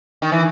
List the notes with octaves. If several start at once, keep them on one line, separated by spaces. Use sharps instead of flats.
D#3
E3